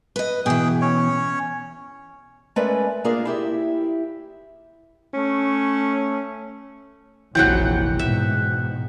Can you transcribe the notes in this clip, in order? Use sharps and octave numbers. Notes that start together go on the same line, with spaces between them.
B4 D#5
B2 E3 G#4 G5
C#4 C#5
G#3 A3 C#4 A#4 B4 D5
A#3 D4 F4 G#4 A#4
E4 G4 E5
A3 C#4
F1 A#1 E3 F#3 F#4 F#5 G5
G#2 B2 E5